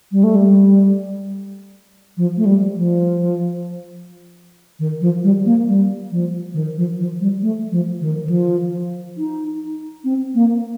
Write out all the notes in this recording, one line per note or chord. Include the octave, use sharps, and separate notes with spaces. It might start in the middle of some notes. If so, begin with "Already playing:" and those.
G3
A3
G3
F3
A3
G3
F3
D#3
F3
G3
A#3
G3
F3
D#3
F3
F3
G3
A3
F3
D#3
D#3
F3
D#4
C4
A#3